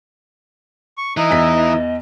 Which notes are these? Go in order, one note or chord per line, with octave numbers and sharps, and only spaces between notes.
C#6
E3 D#4 D#5
E2 B3 B6